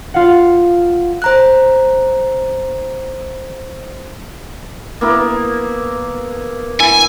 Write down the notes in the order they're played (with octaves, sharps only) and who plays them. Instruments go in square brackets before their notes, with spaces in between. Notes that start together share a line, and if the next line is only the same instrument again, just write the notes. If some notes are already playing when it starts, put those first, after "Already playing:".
[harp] F4 F5 F#5
[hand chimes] C5 A#5 F#6
[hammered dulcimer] A#3 B3 E4
[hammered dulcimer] E4 [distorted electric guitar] G#5